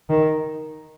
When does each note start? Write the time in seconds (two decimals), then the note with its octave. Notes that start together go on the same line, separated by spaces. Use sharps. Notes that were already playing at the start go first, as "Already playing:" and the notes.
0.09 D#3